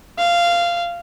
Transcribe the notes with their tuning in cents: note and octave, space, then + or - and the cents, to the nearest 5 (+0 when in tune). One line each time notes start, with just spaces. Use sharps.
F5 -15